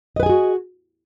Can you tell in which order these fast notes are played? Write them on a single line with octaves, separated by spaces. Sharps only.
D#5 B4 G#5 G#4 F#4